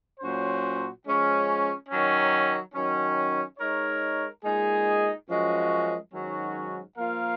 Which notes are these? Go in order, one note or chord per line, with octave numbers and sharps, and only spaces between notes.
A#2 F#3 C#4 F#4 C5
F3 G#3 C#4
D#3 F#3 C#4
D#3 F#3 C#4
G#3 D#4 A#4 C#5
A#2 G#3 D#4 G#4
F#2 F3 G#3 C#4 F#4
G#2 D#3 F#3 C#4 F#4
F3 A#3 F4 A#4 F5